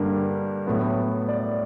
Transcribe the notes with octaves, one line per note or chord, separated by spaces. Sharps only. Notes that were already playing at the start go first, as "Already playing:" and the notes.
Already playing: G2 D3 G3 A#3
A2 F#3 B3
D5